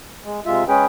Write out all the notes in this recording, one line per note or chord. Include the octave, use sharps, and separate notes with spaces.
G#3
C3 G#3 F4 E5
G#3 C#4 G#4 B4 G5